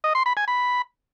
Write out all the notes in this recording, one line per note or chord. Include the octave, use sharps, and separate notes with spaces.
D#5
C6
B5
G#5
B5